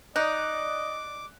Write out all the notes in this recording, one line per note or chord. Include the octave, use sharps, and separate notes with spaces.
D#4 D5 D#5 D6 F#6